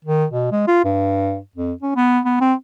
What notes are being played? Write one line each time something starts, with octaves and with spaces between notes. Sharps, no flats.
D#3
B2
G#3
F4
G2
F2
C#4
B3
B3
C4